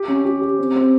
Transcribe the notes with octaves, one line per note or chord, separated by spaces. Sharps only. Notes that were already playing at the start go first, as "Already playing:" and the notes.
Already playing: G4
C#4
G4
G4
C4
C4